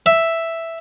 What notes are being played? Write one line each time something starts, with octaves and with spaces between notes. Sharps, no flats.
E5